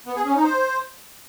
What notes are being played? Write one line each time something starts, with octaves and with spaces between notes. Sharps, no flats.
B3
G#4
C#4
D#4
C5